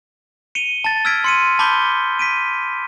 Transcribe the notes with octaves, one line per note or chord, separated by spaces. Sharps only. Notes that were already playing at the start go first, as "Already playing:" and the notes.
C#7 D#7 F7 G7
A5 A6
E6 F6 G#6 B6 D7
C6 C#7 D#7
A5 B5 D6 G6 B6 G7
B6 D7 D#7